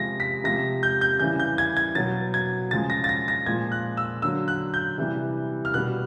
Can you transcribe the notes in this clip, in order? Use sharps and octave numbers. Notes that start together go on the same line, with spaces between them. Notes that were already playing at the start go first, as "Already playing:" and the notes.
Already playing: C3 F3 G#3 A#6
B6
C3 F3 G#3 A#6
G6
G6
C#3 E3 G3 G6
G6
G#6
G#6
B2 F#3 A6
G#6
C#3 F3 G#3 A6
A#6
A6
A#6
A#6
A#2 F3 G#3 G#6
F#6
E6
D3 F#3 E6
F#6
G6
C3 E3 G3
F6
B2 G3 F#6